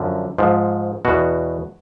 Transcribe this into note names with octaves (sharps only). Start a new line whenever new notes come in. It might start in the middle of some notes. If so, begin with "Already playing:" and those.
Already playing: F#2 D3 F3
G#2 F3
E2 B2 F#4